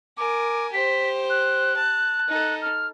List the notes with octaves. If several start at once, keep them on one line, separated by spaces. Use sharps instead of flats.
A#4 G#5 D6
G4 C5 B6
F#6
A5
D#4 A4
F6